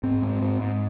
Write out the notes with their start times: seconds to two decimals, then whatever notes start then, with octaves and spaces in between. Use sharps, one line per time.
0.03 G#2 C4
0.22 G#2
0.41 G#2
0.60 G#2